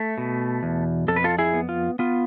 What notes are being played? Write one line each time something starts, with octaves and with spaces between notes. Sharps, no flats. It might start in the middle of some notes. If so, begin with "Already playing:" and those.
Already playing: A3 E5
B2
E2
F2 A4
B4
F4 A4
E4 G#4
B3
F4
B3 F4